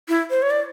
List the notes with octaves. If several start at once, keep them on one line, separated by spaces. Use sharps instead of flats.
E4
C5
C#5
D5